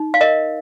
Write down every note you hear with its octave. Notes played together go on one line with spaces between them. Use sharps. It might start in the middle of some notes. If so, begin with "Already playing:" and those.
Already playing: D#4
F5
A#4 D#5